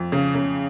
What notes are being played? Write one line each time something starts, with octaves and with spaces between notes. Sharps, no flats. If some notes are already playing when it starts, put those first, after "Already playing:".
Already playing: F2
C#3
C#3